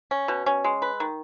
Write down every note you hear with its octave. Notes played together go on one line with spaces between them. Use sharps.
C#4
B2
C#4
G#3
B4
D#3